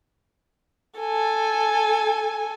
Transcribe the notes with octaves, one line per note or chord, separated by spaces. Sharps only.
A4 G#5